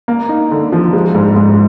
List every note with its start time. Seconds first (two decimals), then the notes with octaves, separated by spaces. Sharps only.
0.08 A#3
0.29 D#4
0.51 D3
0.72 F3
0.93 G#3
1.15 G#2
1.36 G#2